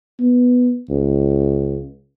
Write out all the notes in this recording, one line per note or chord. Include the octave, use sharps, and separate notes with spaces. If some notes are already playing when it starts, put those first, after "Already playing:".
B3
C#2